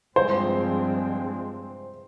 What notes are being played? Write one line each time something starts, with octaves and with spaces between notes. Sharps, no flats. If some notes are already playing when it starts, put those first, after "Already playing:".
G2 F3 G#3 C4 C5